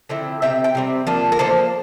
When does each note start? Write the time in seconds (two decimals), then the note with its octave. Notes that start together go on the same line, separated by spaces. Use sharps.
0.09 D3 F3 C4 E4
0.42 C3 G3 C4 E5 G5
0.64 G5
0.75 C3 G3 C4
1.07 F3 A#3 D4
1.32 A#4
1.39 F3 A#3 D4 A4 C5